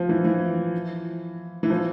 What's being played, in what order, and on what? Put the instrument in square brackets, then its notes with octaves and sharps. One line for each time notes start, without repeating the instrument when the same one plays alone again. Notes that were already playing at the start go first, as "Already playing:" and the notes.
Already playing: [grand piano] F3
E3
E3
E3
F3